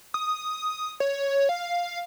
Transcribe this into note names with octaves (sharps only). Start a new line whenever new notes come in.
D#6
C#5
F5